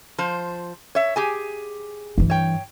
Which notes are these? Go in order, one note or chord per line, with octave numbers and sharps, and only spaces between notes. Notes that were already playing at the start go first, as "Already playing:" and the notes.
F3 C5
C#5 E5
G4 G#4 G#5
G2 E3
C#5 G5